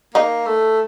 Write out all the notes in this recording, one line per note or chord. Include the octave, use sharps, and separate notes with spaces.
A#3 D#4
A3